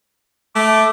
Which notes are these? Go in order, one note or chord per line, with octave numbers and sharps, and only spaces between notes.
A3 D6